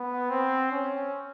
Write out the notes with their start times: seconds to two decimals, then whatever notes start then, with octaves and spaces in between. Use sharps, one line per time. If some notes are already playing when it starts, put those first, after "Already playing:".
Already playing: B3
0.30 C4
0.71 C#4